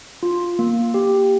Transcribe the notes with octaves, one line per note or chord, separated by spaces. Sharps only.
F4
A#3
G4